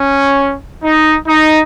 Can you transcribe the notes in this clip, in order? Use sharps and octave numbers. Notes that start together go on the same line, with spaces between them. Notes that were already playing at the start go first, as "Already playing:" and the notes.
Already playing: C#4
D#4
D#4